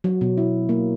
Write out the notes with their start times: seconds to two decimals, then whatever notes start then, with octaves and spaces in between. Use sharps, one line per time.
0.04 F#3
0.21 B2
0.38 E4
0.69 A#3